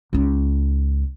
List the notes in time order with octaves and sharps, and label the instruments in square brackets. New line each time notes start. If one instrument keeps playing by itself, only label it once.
[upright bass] C#2 D#4